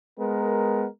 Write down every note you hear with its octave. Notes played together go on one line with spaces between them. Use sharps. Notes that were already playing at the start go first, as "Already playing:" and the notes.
G#3 B3 A#4